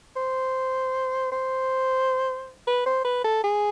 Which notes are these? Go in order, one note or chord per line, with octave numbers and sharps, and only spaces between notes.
C5
C5
B4
C5
B4
A4
G#4